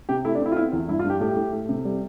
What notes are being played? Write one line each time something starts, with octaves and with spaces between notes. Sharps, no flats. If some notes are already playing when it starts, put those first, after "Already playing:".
C3 G4
A3 E4
D4
C4 E4
F4
B3 E4
E2
G2 E4
F4
G2
G4
A2 G4
A2
A3
C3
G3